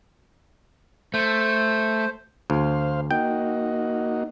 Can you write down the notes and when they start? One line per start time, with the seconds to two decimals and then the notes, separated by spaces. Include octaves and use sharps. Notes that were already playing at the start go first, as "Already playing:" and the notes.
1.14 A3 C5
2.50 D2 C5 F5
3.11 A#3 D#4 F#4 G5